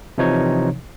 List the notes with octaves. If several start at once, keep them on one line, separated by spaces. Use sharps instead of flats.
C3 E3 F3 D#4 C#5